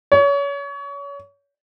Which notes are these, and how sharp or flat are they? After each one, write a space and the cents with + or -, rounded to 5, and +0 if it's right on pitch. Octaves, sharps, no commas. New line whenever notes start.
C#5 +30